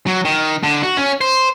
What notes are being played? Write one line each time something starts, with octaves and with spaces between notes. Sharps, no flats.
F#3
D#3
D3
F#4
C#4
C5